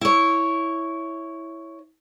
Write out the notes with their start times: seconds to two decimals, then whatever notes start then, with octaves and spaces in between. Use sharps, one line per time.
0.01 E4 C#5